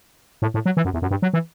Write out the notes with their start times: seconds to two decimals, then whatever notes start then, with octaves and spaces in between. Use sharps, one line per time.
0.42 A2
0.54 A2
0.66 F#3
0.77 E3
0.85 F#2
0.94 E2
1.02 F#2
1.11 G2
1.22 F#3
1.33 E3